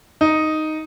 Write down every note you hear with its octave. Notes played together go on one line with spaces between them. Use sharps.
D#4